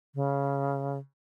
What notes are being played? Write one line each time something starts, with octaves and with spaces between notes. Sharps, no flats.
C#3